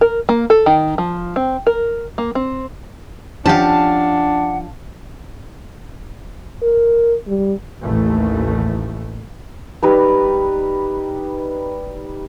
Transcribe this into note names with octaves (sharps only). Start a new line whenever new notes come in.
A#4
A#3
A4
D#3
F3
C4
A#4
A#3
C4
F3 C#4 D4 G4 F5 F#5 A5
A#4
G3
A1 D#2 A3
G3 D#4 B4